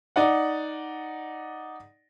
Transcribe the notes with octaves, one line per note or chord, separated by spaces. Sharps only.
D#4 D5 F#5